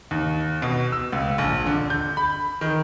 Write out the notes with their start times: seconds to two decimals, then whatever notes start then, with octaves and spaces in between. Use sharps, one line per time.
0.11 D#2
0.62 B2
0.92 E6
1.12 C#2
1.38 A#1
1.67 D3
1.90 G6
2.17 B5
2.61 D#3